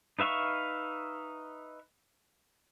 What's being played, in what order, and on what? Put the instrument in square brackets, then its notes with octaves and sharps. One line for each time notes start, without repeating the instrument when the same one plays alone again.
[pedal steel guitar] D#4 B4 E5 F5 C#6